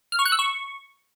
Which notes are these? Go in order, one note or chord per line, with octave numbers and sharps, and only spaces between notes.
F6
C#6
F#6
E6
C#6